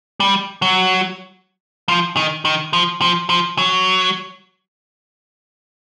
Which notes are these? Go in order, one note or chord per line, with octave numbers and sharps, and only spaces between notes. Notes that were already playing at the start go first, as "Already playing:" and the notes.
G3
F#3
F3
D#3
D#3
F3
F3
F3
F#3